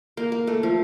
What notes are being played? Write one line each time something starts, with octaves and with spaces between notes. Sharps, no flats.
A#3
A#3
A3
F3